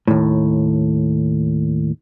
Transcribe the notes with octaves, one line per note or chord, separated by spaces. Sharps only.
D#2 A2